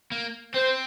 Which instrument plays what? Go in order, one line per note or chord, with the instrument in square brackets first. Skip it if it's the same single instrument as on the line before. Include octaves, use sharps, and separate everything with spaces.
[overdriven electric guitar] A#3
[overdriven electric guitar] C4 [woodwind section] C5